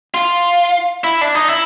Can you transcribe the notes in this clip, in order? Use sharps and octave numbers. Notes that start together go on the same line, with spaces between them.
F4
E4
D4
D#4
E4